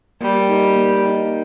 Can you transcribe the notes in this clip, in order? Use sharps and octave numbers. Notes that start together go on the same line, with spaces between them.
G3 A#3
D#4 A#4
A#3
D#4 A#4